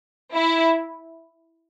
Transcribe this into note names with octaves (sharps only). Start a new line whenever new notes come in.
E4